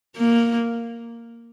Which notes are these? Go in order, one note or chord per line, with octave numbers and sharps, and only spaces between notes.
A#3